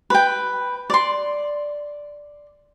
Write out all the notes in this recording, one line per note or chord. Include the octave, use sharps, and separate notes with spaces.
B4 G5
D5 C6